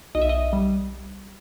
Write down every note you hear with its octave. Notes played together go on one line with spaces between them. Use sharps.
B1 D#5
E5
D#5
G3